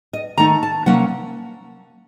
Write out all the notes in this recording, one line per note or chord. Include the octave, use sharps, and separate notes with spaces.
D#5
D#3 A3 D#4 A#5
A5
C3 F#3 A#3 C#4 F#5